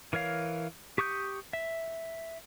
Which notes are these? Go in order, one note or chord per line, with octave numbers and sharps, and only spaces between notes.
E3 A#4 C#5 F5
G4 C#6 D#6 G6
E5